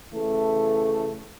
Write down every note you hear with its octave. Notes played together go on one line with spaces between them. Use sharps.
C#3 E3 A3